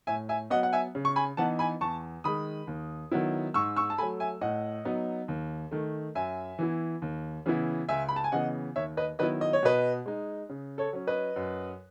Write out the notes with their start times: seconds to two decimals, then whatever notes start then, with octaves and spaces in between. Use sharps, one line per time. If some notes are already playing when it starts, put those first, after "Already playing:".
0.07 A2 E5 G#5
0.29 E5 G#5
0.50 F#3 B3 D#5 F#5
0.63 F#5
0.73 E5 G#5
0.95 C#3
1.05 C#6
1.16 G#5 B5
1.37 E3 B3 D#4 F#5 A5
1.59 G#5 B5
1.81 E2 A5 C#6
2.24 D#3 G#3 B5 D#6
2.67 D#2
3.12 D#3 F#3 B3 E4
3.54 G#2 C#6 E6
3.76 C#6 E6
3.90 A5
3.98 A3 G#5 B5
4.03 F#3
4.20 E5 G#5
4.41 A2 D#5 F#5
4.85 F#3 B3 D#4
5.28 D#2
5.71 D#3 A3
6.15 F#2 E5 G#5
6.59 E3 B3 E4
7.02 D#2
7.46 C#3 E3 B3 E4
7.89 C#2 E5 G#5
8.09 B5
8.16 A5
8.24 G#5
8.32 C#3 E3 B3 D#5 F#5
8.76 D#2 C#5 E5
8.97 B4 D#5
9.19 D#3 F#3 B3 E4 B4 D#5
9.41 D#5
9.53 C#5
9.63 B2 B4 D#5
10.06 G#3 D#4
10.49 C#3
10.78 A4 C#5
10.93 F#3 C#4
11.07 B4 D#5
11.36 F#2